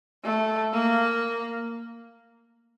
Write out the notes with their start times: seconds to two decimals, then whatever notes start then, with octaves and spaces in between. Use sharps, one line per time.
0.24 A3
0.73 A#3